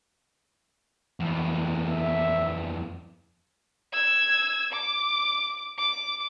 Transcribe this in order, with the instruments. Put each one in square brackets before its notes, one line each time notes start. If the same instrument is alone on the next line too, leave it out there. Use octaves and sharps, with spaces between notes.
[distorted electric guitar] F2 E3
[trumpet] E5
[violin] E6 G#6
D6
D6